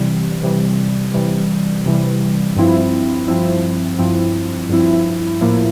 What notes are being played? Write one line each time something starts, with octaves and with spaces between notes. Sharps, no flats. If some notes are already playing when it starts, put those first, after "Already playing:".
Already playing: C3 E3 G3
C3 E3 G3
C3 E3 G3
C3 E3 G3
G2 F3 C4 E4
G2 F3 C4 E4
G2 F3 C4 E4
G2 F3 C4 E4
A2 F3 A#3 E4